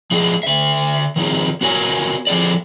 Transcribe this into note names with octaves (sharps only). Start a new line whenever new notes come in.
F3 G#3 D4 G#4
D3 E5
D#3 F3 D#4 G#4
B3 F#4 A#4 C#5 G#5
F3 G#4 A4 D5